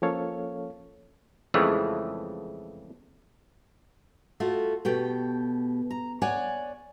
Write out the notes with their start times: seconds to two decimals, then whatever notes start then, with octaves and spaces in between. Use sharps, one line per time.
0.02 F3 A#3 C#4 A4 C#5 F5
1.54 F2 C#3 E3 F3 G#3 A3
4.40 A3 F4 F#4
4.85 B2 A3 G4 G5
5.91 A#5
6.22 C#5 D5 F#5 G#5